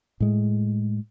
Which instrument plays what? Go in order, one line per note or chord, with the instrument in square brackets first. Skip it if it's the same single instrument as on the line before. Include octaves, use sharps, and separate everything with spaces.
[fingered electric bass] A2 G#3